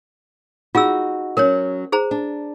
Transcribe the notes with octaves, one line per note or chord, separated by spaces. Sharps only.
D#4 F4 F#4 G#4 E6
F#3 C#4 A#4 C#5
G#4 C5 A#5
D4